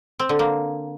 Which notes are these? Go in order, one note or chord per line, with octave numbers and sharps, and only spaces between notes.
C4
D3
A#3